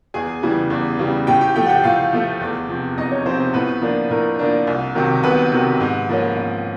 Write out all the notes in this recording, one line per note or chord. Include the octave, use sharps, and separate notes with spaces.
E2 G#4 G#5
C#3 E3 G3
E2
C#3 E3 G3
A2 G4 G5
G4 G5
F3 A3 G4 G5
F#5
G4 G5
A2 F4 F5
F3 A3
E2
C3 F3
E2 D#4 D#5
C#4 C#5
C3 F3 C4 C5
A2 B3 B4
F3 A#3 D4
A2 A#4
F3 A#3 D4
C2
C3 D#3 F#3
C2 B3 B4
C3 D#3 F#3
G#2
F3 A#3 C#4
G#2